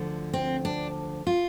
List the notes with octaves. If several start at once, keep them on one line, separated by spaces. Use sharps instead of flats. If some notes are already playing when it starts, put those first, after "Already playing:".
Already playing: D2 D3 F3
C4
D4
F4